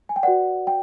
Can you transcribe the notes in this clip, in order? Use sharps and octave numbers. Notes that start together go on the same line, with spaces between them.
G#5
G5
F#4 B4 D5 F#5
G5